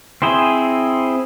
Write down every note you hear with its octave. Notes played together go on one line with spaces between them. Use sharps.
C4 E4 G#4 C5